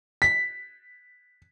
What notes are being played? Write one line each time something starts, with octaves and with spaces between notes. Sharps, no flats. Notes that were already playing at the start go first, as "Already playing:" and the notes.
B6